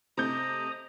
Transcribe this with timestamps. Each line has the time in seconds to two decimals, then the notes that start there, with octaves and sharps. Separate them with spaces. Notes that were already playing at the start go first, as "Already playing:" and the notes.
0.17 C3 A3 D#5 A#5 D#6 G6